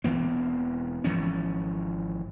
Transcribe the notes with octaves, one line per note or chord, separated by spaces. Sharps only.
E1 E3 B3 C4
G#1 E3 F3 C#4